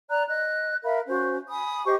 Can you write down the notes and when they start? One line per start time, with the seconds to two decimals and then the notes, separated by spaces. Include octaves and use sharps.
0.10 D5 A#5 F#6
0.28 D#5 F#6
0.83 A#4 E5 F5 B5
1.07 C#4 F#4 C5
1.49 G#5 B5 D#6
1.86 G4 C5 D#5 C#6